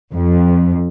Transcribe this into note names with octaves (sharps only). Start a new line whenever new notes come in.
F2